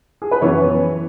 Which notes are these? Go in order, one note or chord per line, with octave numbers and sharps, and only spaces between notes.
G#4
B4
F#2 E3 B3 C#5